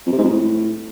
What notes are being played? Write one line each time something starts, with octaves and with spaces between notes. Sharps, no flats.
F2
C3
G#2
F2
A2